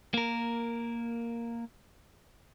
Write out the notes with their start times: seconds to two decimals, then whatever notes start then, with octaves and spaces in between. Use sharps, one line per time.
0.14 A#3 A#4